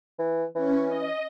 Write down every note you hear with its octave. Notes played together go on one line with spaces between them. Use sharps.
E3
E3 C#4
D#5